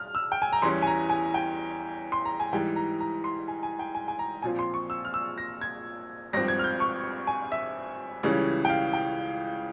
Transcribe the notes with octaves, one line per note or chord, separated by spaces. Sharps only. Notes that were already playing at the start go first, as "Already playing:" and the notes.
Already playing: F6
E6
G5
G#5
A#5
E2 E3 G3 C#4 C6
G#5
A#5
G#5
G5
C6
A#5
G#5
G#2 E3 G3 G5
A#5
A#5
C6
G#5
G#5
G5
G#5
G#5
A#5
A#1 A#2 F3 C4 G#5
C6
C#6
E6
F6
E6
A#6
G#6
G#1 G2 F3 C4 A#6
G#6
F6
G6
C#6
G#5
E5
C#2 C#3 E3 G3 C#4
G5
F5
G5